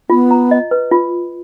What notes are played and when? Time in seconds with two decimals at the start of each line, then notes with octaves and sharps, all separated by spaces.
0.10 B3 F4
0.31 A#5
0.51 D#5
0.71 B4
0.91 F4